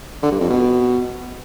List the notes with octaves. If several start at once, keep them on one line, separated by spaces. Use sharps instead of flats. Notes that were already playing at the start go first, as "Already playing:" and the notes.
D3
G2
F2
B2